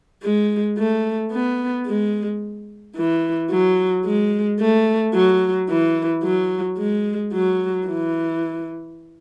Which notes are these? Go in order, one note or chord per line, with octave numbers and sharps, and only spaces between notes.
G#3
A3
B3
G#3
E3
F#3
G#3
A3
F#3
E3
F#3
G#3
F#3
E3